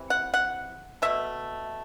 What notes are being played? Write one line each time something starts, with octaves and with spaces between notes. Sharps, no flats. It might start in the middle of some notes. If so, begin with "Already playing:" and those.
Already playing: C3 E3
F#5
F#5
B2 A3 E5